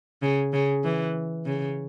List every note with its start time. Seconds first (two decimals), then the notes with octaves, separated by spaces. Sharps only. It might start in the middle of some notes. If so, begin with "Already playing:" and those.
0.22 C#3
0.53 C#3
0.84 E3
1.46 C#3